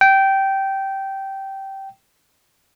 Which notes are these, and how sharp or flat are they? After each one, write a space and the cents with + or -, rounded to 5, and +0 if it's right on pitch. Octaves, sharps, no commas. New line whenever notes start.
G5 -15